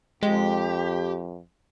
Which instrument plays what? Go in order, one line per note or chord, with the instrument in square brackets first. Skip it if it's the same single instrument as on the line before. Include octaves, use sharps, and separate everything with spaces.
[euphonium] F2 [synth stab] G#3 [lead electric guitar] G4